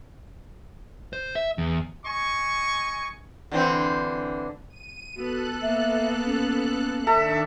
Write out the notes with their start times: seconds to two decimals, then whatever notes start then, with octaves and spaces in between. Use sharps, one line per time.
1.13 C5
1.35 E5
1.58 E2
2.06 D#5 G#5 C#6
3.52 D3 E3 C4
4.69 D#7
5.16 B3 F#4 A4 F#6
5.62 A#3 B3 E5
6.25 C#4
7.07 D#3 D4 A4 E5